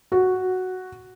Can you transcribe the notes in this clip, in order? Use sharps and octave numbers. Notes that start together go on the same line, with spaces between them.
F#4